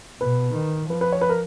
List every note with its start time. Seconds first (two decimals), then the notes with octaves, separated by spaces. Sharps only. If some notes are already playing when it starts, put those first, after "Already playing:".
0.20 B2 B4
0.55 D#3
0.90 F3 B4
1.01 B4
1.12 C#5
1.21 B4
1.29 A#4